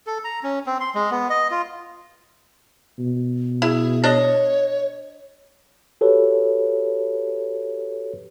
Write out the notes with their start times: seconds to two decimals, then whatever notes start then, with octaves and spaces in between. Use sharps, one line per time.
0.07 A4
0.24 A#5
0.43 C#4
0.66 C4
0.80 C6
0.95 G#3
1.11 B3
1.30 D#5
1.51 F4
2.99 B2
3.62 E4 G#4
4.04 D4 C#5 D#5
6.01 F#4 G4 A4 B4 C#5